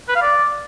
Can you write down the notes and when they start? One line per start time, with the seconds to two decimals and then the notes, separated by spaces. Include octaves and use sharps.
0.09 B4
0.15 F5
0.22 D5